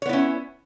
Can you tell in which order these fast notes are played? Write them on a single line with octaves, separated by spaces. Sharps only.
C#5 B3 E4 C#4